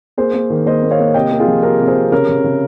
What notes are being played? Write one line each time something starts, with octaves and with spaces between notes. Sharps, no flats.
A#3 G#4 C5
A#3
D#3
A#3 C5 D#5
A#3
C#5 F5
A#3
C3 D#5 G5
A#3
F4 G#4
F3
C3 G4 A#4
C3
G#4 C5
C3
C#3 A#4 C#5
C#3
C#3